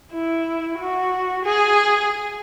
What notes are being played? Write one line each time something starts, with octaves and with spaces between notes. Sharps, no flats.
E4
F#4
G#4